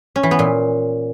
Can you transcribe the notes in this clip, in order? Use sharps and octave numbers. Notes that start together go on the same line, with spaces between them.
C#4
E3
B3
A#2